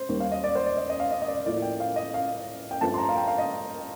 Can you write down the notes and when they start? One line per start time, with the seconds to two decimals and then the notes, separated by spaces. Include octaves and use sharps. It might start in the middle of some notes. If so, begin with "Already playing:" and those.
Already playing: C5
0.09 D#2 D#3 G3
0.20 F5
0.32 D#5
0.44 D5
0.55 C5
0.66 D5
0.77 D#5
0.89 D#5
1.00 F5
1.11 D#5
1.22 D#5
1.28 D5
1.46 A2 F3 A#3 D5
1.62 G5
1.80 F5
1.96 D#5
2.14 F5
2.71 G5
2.81 G2 F3 A3 C4 A5
2.94 C6
2.98 A#5
3.09 F5
3.16 G5
3.28 F5
3.38 D#5